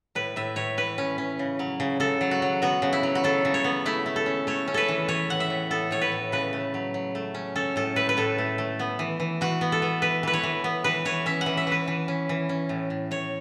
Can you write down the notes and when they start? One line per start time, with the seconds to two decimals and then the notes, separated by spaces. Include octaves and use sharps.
0.15 A2 B4
0.36 A2 E5
0.56 A2 C#5
0.77 E3 B4
0.98 C#4
1.18 C#4
1.39 C#3
1.59 F#3
1.80 C#3
2.00 C#3 A4
2.21 F#3
2.31 F#4
2.42 F#3
2.62 B3 F#4
2.82 C#3
2.93 E4
3.03 F#3
3.15 F#4
3.24 F#3 A4
3.45 C#3
3.54 C#5
3.64 B3
3.86 A3 E4
4.06 A3
4.16 A4
4.26 C#4
4.47 A3 C#5
4.68 C#4
4.74 A4 B4
4.88 E3
5.08 E3 C#5
5.29 A2 F#5
5.40 E5
5.50 A2
5.71 B3 A4
5.91 A2 C#5
6.01 B4
6.12 A2
6.32 C#3 B4
6.53 A3
6.74 F#3
6.94 F#3
7.15 A3
7.35 C#4
7.55 C#4 A4
7.76 A2 A4
7.96 A3 B4
8.09 B4
8.17 A2 A4
8.38 A3
8.58 A3
8.79 B3
8.99 E3
9.20 E3
9.41 E3 F#4
9.61 B3
9.72 A4
9.82 B3
10.02 E3 B4
10.23 E3 B4
10.33 C#5
10.43 E3
10.64 B3
10.84 E3 B4
11.05 E3 C#5
11.26 C#4 E5
11.41 F#5
11.46 E3
11.57 E5
11.67 E3 B4
11.88 E3
12.08 C#4
12.29 E3
12.49 C#4
12.69 A2
12.90 A2
13.11 A2 C#5